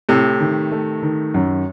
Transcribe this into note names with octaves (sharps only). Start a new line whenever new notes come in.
A2 C3 A3
D#3
A3
D#3
F#2